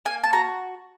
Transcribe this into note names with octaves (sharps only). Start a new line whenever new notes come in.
A#3 G#5
A5
F#4 A#5